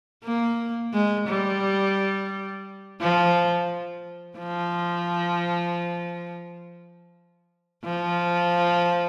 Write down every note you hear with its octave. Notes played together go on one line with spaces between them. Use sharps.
A#3
G#3
G3
F3
F3
F3